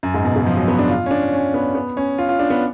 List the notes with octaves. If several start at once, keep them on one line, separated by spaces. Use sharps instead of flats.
F#2
G#2
B2
C#3
F3
F#3
B3
D4
F4
C#4
D4
C#4
B3
B3
C#4
F4
F4
D4
B3